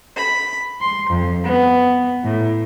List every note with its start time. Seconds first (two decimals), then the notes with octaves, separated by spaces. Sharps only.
0.17 B5
0.81 C6
1.10 F2
1.44 B3
2.24 A2